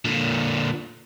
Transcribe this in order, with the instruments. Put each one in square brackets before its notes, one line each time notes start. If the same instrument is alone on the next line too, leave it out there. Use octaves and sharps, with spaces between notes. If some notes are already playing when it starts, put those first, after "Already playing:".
[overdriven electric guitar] A#2 D3